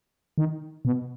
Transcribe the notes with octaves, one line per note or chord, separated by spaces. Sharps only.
D#3
B2